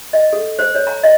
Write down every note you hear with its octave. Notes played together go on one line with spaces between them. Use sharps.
D#5
A4
C5
C#5
A#5
D#5